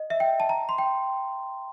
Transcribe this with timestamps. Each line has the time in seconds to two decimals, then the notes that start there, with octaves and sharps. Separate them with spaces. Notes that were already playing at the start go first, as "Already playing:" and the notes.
Already playing: D#5
0.10 E5
0.20 G5
0.40 A5
0.49 A#5
0.69 C6
0.78 G5